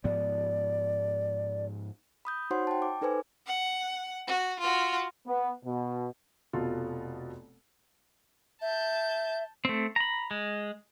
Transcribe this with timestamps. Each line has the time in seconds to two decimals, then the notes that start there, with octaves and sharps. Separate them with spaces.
0.04 G#2 F3 B3 D5
2.25 B5 D#6 G6
2.51 D#4 F#4 C5 C#5 F#5 C6
2.67 G5 A5
2.82 D6
3.01 D#4 A4 B4 C5 G#5 D6
3.47 F#5
4.27 F#4
4.60 F4 F#4
5.27 B3
5.64 B2
6.53 F1 B2 F4 A4
8.62 E5 A5 G6
9.65 A3 C4
9.96 A#5 B5
10.31 G#3